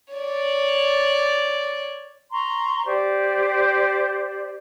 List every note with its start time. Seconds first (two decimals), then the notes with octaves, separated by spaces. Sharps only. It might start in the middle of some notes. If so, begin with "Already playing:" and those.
0.14 C#5 D5
2.32 A#5 C6 C#6
2.86 G4 C5 D5